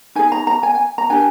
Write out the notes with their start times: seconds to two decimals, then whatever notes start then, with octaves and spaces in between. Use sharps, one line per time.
0.15 D#4 G#4 G#5
0.32 A#5
0.47 A#5
0.63 G#5
0.75 G#5
0.98 A#5
1.10 D4 G4 A#4 G#5